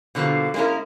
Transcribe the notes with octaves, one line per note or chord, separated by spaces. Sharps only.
B2 D3 F3 G3 A#3
G#3 A#3 C#4 E4 A#4